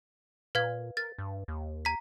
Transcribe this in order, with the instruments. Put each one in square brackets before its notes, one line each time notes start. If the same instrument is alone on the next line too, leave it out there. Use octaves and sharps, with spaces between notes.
[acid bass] A#2 [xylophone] B4 F5 G#6
[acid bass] A#4 [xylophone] A6
[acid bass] G2
D#2
[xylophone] A#5 B6